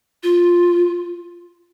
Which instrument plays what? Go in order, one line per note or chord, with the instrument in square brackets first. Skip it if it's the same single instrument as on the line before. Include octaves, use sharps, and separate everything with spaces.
[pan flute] F4